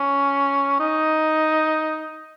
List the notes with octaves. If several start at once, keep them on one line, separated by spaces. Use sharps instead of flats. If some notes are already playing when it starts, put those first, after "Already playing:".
Already playing: C#4
D#4